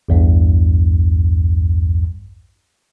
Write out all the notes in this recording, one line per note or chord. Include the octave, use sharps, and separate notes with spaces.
A#1 E2 G2